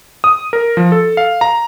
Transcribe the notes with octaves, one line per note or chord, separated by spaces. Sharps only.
D#6
A#4
F3
A4
F5
A#5